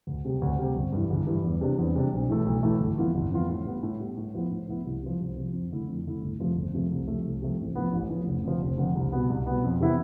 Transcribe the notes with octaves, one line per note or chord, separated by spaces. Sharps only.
D2
C3 G3
D2
C3 G3
G1
G2 E3
G1
G2 E3
E2
C3 G3 D4
E2
C3 G3 D4
B1
A2 E3 A3
B1
A2 E3 A3
G1
F2 E3 B3 F4
G1
F2 E3 B3 F4
A2
G3 B3
A2
G3 B3
A2
F3 B3 E4
A2
F3 B3 E4
C2
C3 F3
C2
C3 F3
F2
D3 A3 E4
F2
D3 A3 E4
G1
F2 C3 F3 A3
G1
F2 C3 F3 A3
C2
C3 F3 A3
C2
C3 F3 A3
A1
A2 F3 B3
A1
A2 F3 B3
F1
F2 D3 F3
F1
F2 D3 F3
C2
B2 B3
C2
B2 B3
F2
C3 E3 B3 E4